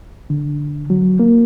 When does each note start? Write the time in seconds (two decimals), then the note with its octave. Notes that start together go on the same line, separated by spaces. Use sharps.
0.30 D3
0.90 F#3
1.20 A#3